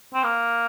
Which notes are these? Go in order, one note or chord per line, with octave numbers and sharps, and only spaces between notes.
C4
A#3